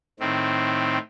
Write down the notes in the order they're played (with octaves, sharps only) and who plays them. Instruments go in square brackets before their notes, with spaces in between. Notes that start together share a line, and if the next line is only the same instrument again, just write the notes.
[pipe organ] A2 D#3 C4